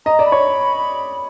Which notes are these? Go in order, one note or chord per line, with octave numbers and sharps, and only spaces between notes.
D#5 A#5
D5
B5
C#5